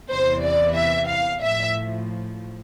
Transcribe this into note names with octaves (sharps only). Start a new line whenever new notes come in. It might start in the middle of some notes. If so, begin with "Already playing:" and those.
E2 C3 E3 C5
D5
E5
F5
A2 F3 E5